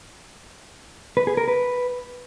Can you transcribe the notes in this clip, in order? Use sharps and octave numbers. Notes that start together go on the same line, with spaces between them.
B4
G#4
A#4
B4